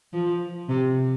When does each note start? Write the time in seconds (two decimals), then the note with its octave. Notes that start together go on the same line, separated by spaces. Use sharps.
0.13 F3
0.69 C3